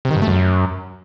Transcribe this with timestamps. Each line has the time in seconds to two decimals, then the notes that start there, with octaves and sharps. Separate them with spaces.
0.05 C3
0.11 D#3
0.16 G2
0.22 A3
0.28 F#2